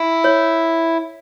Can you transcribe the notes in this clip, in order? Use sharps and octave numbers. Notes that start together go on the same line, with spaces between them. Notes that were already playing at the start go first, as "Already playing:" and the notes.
Already playing: E4
C#5